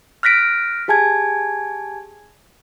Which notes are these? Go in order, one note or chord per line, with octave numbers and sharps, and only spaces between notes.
F6 F#6 A#6 B6 D7
G4 G#4 G#5 A5 G#6